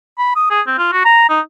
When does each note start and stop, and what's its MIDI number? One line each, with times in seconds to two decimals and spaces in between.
0.18 0.33 83
0.36 0.46 87
0.50 0.61 68
0.67 0.74 60
0.78 0.89 65
0.92 1.03 66
1.05 1.25 82
1.29 1.40 63